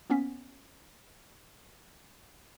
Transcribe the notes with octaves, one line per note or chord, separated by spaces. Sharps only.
A#3 B3 C#4 B6